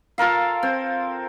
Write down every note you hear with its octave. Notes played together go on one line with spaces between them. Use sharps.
F4 A4 A#4 F5
C4